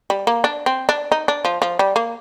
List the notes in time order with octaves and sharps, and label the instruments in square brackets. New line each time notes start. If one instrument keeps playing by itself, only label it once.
[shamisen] G3
A#3
D4
C4
D4
D#4
D4
F3
F3
G3
A#3